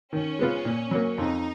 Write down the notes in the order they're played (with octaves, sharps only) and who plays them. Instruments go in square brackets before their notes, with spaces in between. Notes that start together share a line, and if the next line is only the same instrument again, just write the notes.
[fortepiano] D#3 [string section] C#4
[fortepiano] G#3 B3 F4
A#2
F#3 A#3
[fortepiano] F2 [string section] D#4